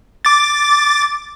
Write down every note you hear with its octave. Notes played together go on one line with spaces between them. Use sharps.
D6 A6